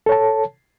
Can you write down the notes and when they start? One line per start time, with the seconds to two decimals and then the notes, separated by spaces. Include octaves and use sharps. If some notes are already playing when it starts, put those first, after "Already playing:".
0.06 A4
0.09 C#5
0.12 A5